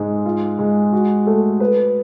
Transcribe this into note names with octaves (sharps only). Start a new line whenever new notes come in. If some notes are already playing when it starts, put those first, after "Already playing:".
Already playing: G#2 G#3
F4
G#3
F#4
A3
B4